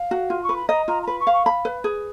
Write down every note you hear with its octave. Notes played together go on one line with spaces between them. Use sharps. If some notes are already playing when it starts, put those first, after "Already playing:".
Already playing: F5
F#4
F4
C#6
B4
B5
D#5 A#5
F4 A#5
A#5
B4 B5
C#6
F5
C#6
B5
B4
G#4